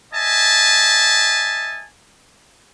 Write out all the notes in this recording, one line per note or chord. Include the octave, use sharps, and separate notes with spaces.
D#5 E5 G#5 A5